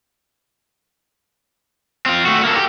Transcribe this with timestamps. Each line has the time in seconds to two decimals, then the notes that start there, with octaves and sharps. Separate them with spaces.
2.06 C4 F4
2.26 A3 F#4
2.44 A#3 A4
2.56 G4